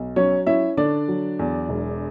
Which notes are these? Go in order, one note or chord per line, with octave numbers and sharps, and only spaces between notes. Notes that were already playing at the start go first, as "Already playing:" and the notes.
Already playing: B1
F#3 C#4 C#5
C#4 E4 E5
D3 D4 D5
F#3
E2
E1